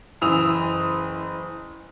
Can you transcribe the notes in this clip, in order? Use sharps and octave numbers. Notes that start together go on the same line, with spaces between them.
F#1 E3 D#6 E6 F7